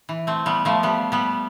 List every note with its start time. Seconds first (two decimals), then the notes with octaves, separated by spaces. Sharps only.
0.09 E3
0.27 A3 C4
0.46 G3 B3
0.65 F3 A3
0.83 G3 B3
1.12 G3 B3